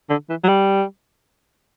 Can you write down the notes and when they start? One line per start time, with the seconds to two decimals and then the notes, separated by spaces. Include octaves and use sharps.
0.10 D3
0.29 E3
0.44 F#3
0.48 G3